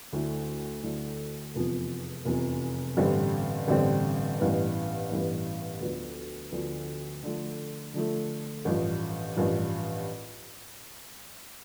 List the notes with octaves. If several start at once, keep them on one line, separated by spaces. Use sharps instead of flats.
D2 D3 A3 E4
D2 D3 A3 E4
F1 E2 C3 F3
F1 E2 C3 F3
A1 G2 D3 G3 C4
A1 G2 D3 G3 C4
A1 G2 E3 B3
A1 G2 E3 B3
D2 D3 F3 B3
D2 D3 F3 B3
D3 F3 A3
D3 F3 A3
A1 G2 F3
A1 G2 F3